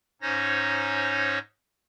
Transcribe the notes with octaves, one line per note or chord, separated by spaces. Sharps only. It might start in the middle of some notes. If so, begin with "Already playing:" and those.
G#2 C#4 D#4 C5 C#5 A#6